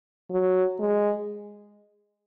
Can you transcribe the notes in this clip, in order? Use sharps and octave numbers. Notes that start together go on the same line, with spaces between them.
F#3
G#3